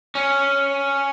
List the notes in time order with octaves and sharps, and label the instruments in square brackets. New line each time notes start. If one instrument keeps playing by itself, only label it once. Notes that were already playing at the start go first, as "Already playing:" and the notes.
[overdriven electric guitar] C#4